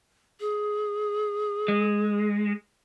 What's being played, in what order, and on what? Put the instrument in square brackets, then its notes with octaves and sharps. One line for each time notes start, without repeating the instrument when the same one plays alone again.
[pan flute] G#4
[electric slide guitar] G#3